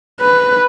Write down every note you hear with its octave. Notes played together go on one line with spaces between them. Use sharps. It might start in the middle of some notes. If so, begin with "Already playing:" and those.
B4